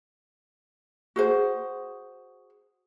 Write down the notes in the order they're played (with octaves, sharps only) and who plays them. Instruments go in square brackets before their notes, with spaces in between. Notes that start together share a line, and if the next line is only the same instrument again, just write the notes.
[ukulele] F#4 G#4 C5